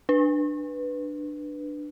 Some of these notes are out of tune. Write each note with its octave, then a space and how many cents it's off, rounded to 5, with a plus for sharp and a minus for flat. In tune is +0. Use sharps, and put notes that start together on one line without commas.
D4 +15 B4 +0